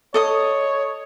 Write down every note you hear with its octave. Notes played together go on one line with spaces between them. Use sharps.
A4 C#5 D#5 D#6